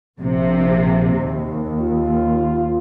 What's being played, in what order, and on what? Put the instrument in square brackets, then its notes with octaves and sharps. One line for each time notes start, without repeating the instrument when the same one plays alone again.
[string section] A#1 C3
D#2
[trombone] F4